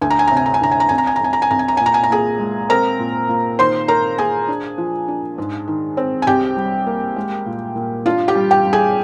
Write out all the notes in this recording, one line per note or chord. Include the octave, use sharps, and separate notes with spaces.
D2 G#5
A#5
G#5
A#5
C3
G#5
A#5
G#5
D2 A#5
G#5
A#5
C2 G#5
A#5
G#5
A#5
C2 G#5
A#5
G#5
C2 A#5
G#5
A#5
A#2 G#5
A#5
G#5
A#5
A#2 G#4 G#5
G#3
C4 A#4 A#5
A#2
A#2
D#3 C5 C6
A#3 A#4 A#5
A#3 G#4 G#5
D4
F3
D4
G#2
D#3
C4
G#5
C2 G4 G5
G3
A#3
G#3
A#2
A#2
D4 F4 F5
G4 G5
G3
G4 G5
G3
G#4 G#5